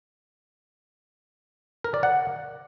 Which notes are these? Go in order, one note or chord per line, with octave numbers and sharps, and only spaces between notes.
A#4
D5
F#5